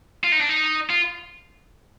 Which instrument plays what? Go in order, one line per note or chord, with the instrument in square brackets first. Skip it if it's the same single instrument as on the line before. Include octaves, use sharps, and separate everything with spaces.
[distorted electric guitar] F4
D#4
D4
D#4
F4